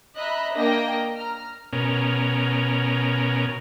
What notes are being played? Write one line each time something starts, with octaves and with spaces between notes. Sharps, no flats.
D#5 E5 A#5 B5 F#6
A#3 D4 A#4 D#5 G5 A#6
A#5 F6
B2 C#4 A#4